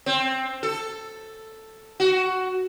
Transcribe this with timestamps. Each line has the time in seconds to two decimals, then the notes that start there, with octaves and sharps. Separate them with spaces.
0.06 C4
0.63 A4
2.00 F#4